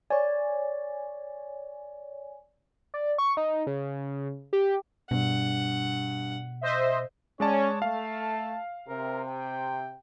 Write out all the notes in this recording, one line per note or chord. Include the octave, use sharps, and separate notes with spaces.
C#5 D5 G#5
D5
C#6
D#4
C#3
G4
G2 B2 F#5
C5 D#5 E5
G#3 C#4 C#5 D5 A5
A3 F5 A5
C3 A#4
G5